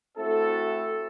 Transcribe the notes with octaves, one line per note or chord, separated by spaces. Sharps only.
A3 C4 E4 F#4 A4